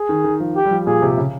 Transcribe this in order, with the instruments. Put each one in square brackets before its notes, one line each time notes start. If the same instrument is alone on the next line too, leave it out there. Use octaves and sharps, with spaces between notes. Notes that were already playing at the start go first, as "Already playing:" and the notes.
Already playing: [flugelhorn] G#4
[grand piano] D#3
D#3
F3
[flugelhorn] G4
[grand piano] G3
F3
[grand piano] A#2 [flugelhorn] G#4
[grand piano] C3
C#3